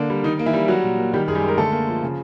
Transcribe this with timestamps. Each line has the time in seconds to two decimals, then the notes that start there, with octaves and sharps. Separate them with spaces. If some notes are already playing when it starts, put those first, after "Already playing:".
Already playing: D3 A#3 D4
0.10 G3
0.24 D#3 D#4
0.39 A#3
0.46 E3 E4
0.53 G3
0.68 F#3 F#4
0.83 A#2
0.98 A#3
1.13 D#3 G3 G4
1.27 F#2 G#4
1.35 G3 G4
1.43 G#3 A#4
1.57 D3 A3 A4
1.72 A#3
1.88 F3
2.03 C#3